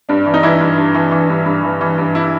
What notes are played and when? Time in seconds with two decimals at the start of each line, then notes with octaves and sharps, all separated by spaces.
0.09 G2 D4
0.26 E3
0.34 D#4
0.43 E3 E4
0.61 G2
0.78 G2
0.94 E3
1.11 E3
1.30 G2
1.46 G2
1.63 E3
1.81 E3
1.98 G2
2.15 E4